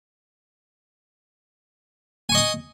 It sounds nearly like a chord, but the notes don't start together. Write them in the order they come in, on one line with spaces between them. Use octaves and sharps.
G#5 C#6 D#5 D#6